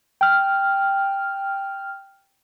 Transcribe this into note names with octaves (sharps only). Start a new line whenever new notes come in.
G5 F6